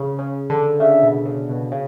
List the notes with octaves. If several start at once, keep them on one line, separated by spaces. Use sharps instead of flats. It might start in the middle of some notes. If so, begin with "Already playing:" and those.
Already playing: C#3
C#3
D3
C#3 E5
B2
C#3
B2
C#3